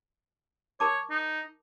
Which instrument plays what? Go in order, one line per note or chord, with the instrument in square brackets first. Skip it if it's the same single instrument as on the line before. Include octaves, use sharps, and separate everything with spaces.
[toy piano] A#4 A5 D6 [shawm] C#5
[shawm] D#4